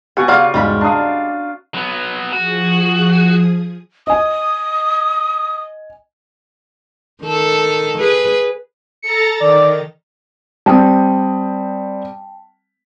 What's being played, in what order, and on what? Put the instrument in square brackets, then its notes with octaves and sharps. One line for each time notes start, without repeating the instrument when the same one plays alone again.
[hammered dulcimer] B2 F#5 C#6 [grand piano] G4 [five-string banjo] G#5
[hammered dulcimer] C#3 F4 [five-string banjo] D5 F5 F#5
[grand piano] E1 G#2 [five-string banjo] G3 G#3 B5
[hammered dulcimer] D4 F5 [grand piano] A#5 D#6
[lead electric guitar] F#3 B3
[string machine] F3 G#4 D#6 [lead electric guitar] F#4
[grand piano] D#5 G#5 [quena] D#6
[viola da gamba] D#3 A4
G#4 B4
[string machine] A4 A#5 A6 [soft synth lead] C#7
[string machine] D#3 [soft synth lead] D5
[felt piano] G3 C4 D#6 [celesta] G5 A5